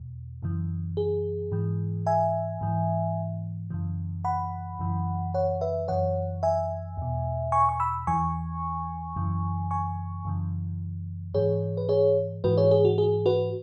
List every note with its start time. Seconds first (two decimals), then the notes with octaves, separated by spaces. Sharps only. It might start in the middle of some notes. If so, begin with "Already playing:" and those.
Already playing: E2 B2
0.42 F#2 C#3 E3
0.97 G#4
1.52 G#2 E3
2.07 E5 G#5
2.61 G#2 E3
3.70 F#2 C#3 E3
4.25 F#5 B5
4.79 F#2 C#3 E3
5.34 C#5 F#5
5.61 B4 E5
5.88 F#2 E3 C#5 F#5
6.43 E5 G#5
6.97 E2 B2
7.52 G#5 C#6
7.69 C#6
7.80 B5 E6
8.07 E2 E3 G#5 C#6
9.16 F#2 C#3 E3
9.71 G#5 C#6
10.25 F#2 C#3 E3
11.34 G#2 E3 G#4 C#5
11.77 B4
11.89 G#4 C#5
12.44 G#2 E3 F#4 B4
12.58 G#4 C#5
12.71 G#4
12.85 F#4
12.98 G#4
13.26 F#4 B4